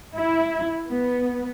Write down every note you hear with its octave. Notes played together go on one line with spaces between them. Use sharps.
E4
B3